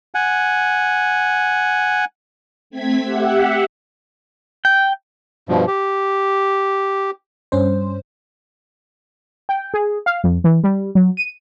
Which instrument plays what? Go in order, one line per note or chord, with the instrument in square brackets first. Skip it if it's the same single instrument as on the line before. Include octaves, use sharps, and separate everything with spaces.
[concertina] F#5 G#5
[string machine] A3 C4 G#6 B6
G4 E5 F#5
[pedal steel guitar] G5
[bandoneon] G2 B2 F3
G4
[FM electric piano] G2 C#4 C5
[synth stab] G5
G#4
F5
F2
E3
G3
F#3
D#7